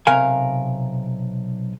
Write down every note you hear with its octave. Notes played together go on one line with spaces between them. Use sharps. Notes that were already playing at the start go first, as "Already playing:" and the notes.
B1 C3 A#4 F5 G#5